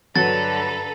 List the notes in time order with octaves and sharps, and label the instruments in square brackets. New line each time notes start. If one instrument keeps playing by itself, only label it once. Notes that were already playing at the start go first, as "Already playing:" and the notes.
[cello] G2 D3 [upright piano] F#3 F#4 [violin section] A4 B4 A#5 [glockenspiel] A6